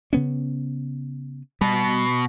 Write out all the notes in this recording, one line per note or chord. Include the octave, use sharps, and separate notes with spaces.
C#3 B3 C#4
B2 G3